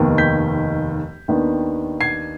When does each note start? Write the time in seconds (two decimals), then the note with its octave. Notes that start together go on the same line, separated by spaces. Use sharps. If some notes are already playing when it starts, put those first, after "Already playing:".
Already playing: F1 D#2 D#3 B3
0.18 G6 B6
1.28 D#2 D#3 B3 D4
2.01 G#6 C7